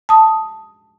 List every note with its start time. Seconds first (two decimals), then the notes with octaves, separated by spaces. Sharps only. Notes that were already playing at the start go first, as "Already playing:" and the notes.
0.09 A5 D#6